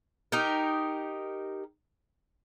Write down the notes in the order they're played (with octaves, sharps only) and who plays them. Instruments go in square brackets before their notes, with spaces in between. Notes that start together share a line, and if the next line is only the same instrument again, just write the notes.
[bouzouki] D#4 G4 A#4